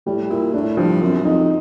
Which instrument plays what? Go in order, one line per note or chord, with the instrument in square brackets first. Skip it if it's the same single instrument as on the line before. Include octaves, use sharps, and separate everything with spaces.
[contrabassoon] A2 [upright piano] G3
[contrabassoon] A#2 [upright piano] E4
[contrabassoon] A2 [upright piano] D4
[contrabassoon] G2 [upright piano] F3
[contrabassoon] F#2 [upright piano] C4
[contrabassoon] F2 [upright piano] D#4